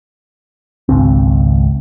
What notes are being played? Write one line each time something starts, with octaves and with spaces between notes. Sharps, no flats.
G#1 C#2 C4